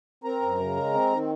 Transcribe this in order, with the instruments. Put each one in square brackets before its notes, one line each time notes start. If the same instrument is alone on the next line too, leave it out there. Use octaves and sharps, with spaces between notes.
[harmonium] C4 A#4 A#5
F#2
C#3
G#3
C4
D#3